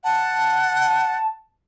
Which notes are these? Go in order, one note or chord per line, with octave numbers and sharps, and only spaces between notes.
F#5 A5